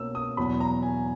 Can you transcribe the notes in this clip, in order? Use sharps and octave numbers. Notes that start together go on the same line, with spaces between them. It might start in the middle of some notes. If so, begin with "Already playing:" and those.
Already playing: B2 A#3 C#4 E6
D#6
E2 B2 F#3 B5
A#5
G#5